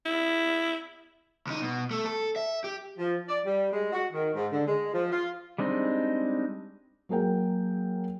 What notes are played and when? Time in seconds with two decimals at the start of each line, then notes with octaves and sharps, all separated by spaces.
0.06 E4
1.47 C#2 D#4
1.62 B2
1.91 A3
2.05 A4
2.36 E5
2.64 G4
2.98 F3
3.28 D5
3.44 G3
3.72 G#3
3.92 F#4
4.12 D#3
4.34 G#2
4.52 D3
4.66 G#3
4.93 F3
5.11 F4
5.58 G3 G#3 C4 D4 D#4
7.09 F#3 A#3 G#4 A#4 G5